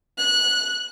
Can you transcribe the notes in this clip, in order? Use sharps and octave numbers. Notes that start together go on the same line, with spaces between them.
F#6